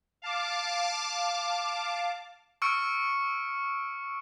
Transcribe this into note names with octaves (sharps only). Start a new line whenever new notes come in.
F5 A5 D6
C#6 E6 F6 C#7 D7